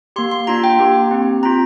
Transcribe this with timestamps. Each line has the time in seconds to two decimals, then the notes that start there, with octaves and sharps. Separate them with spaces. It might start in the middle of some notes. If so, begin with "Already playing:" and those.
0.16 A#3 G4 C6
0.31 C6
0.47 A#3 D4 F4 A#5
0.64 G5
0.79 A#3 G4
1.11 C4 G4
1.43 C4 F4 A#5